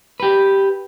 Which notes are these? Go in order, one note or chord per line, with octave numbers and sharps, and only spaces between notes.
G4 B4